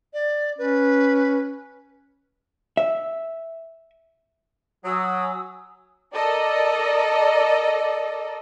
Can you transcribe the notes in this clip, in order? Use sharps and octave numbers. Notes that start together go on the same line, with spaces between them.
D5
C#4 B4
E5
F#3 G#5 D#6 E6
A4 A#4 D5 D#5